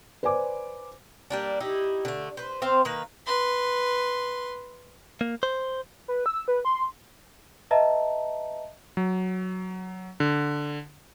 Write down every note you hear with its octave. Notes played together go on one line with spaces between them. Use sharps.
B4 C5 D5 G#5 D6
G3 A#3 D4
D#4 E4 G4
D3 A3
B4 C5
C4 C5 F5
D#3 A#3 B4
B4 C6
A#3
C5
B4
E6
B4
C6
B4 D#5 E5 A5 A#5
F#3
D3